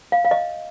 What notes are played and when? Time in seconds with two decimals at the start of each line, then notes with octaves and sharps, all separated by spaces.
0.12 F5
0.25 F5
0.31 D#5